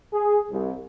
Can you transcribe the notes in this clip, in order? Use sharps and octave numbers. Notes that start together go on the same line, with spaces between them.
G#4
C2